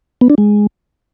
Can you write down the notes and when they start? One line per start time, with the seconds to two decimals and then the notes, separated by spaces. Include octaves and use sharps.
0.21 B3
0.30 D4
0.38 G#3